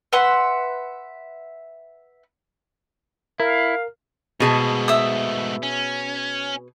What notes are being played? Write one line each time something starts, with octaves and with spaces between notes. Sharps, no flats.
B4 E5 F#5 C6
E4 A#4 F5
G#2 B2 A3 G#4 A5
E5 D#6
C#4